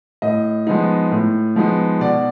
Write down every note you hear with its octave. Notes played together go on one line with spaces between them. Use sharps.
A2 D#5
F3 G#3 B3 D#4
A2
F3 G#3 B3 D#4
B2 D5